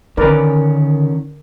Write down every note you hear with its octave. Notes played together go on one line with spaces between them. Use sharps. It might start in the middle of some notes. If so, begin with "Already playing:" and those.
D3 D#3 C#4 A#4 B4 D5